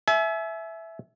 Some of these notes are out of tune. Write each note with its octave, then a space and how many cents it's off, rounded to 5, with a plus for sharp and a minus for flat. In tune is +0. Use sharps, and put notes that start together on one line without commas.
E5 +0 G#5 +40